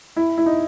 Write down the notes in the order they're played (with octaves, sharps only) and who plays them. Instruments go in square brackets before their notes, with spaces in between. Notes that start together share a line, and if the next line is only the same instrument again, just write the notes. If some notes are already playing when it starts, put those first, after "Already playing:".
[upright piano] E4
E4
D#4